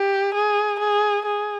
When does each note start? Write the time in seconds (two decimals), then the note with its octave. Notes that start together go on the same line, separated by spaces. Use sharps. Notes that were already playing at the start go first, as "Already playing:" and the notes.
Already playing: G4
0.34 G#4
0.80 G#4
1.26 G#4